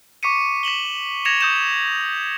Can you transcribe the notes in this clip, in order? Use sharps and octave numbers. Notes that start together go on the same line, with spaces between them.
C#6 D6 B6 C#7 D#7
B6 E7 F#7 G7
G#6 A#6 C#7 E7 F7
D#6 G6 E7